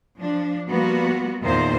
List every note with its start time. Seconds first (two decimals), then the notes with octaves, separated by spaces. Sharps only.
0.20 F3 D4
0.69 F3 G3 A#3 B3 F#4
1.42 E2 A#2 D#3 F4 C5